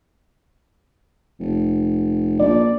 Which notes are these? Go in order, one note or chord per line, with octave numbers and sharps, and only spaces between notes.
F1
A#1 D5